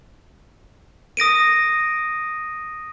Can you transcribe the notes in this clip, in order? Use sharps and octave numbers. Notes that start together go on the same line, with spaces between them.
D#6 A#6 D7 D#7